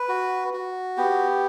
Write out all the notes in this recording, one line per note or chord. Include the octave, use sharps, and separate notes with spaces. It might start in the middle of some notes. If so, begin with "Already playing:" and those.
Already playing: B4
F#4
F#4
B3 G4